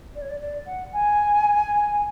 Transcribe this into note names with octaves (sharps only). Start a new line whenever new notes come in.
D5
C#5
D5
D5
F#5
G#5